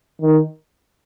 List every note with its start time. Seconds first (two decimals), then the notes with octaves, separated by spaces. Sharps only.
0.22 D#3